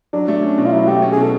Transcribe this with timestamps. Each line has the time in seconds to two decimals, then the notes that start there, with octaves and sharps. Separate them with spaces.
0.13 F#3 D4
0.28 A3
0.43 C#4
0.58 B2
0.66 F4
0.72 F#3 E4
0.88 A3 G4
1.02 C#4
1.12 G#4
1.17 B2
1.23 A4